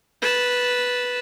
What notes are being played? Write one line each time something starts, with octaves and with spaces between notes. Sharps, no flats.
B4 A5